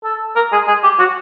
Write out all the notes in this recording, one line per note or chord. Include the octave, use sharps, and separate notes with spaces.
A4
A#4
G#4
G#4
G4
F#4